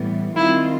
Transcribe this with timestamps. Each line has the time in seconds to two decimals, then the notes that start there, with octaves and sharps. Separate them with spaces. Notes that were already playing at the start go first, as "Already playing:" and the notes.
Already playing: A2 E3 G3 B3
0.35 D#3 G3 C4 E4 F4